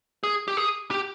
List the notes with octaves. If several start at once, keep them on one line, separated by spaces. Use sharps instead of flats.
G#4
G4
G#4
G4